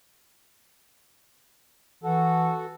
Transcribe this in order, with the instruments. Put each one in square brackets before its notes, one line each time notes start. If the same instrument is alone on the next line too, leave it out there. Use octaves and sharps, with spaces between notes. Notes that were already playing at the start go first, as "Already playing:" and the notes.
[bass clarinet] E3 [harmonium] F#4 A4